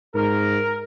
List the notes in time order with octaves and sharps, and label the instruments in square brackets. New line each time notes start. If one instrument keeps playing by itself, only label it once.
[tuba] G#2 [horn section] A#4